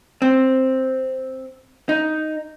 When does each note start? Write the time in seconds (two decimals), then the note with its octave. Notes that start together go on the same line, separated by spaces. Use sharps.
0.22 C4
1.89 D#4